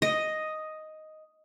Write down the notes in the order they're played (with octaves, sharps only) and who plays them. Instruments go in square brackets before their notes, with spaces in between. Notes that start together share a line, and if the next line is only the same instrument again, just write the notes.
[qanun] D#5